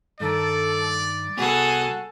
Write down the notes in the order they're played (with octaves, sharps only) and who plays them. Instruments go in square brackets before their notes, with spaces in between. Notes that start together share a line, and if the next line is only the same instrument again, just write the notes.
[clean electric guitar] G2 D#3 [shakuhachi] A4 [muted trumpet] D5
[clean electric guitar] C2 G2 B3 [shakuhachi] F#4 [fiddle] G#4 A4